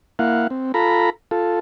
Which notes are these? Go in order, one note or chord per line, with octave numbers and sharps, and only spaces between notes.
A#3 E4 F5 F#5
C4
F4 A4 A#5 B5
F4 A4